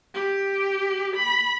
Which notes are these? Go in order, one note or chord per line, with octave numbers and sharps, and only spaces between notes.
G4
B5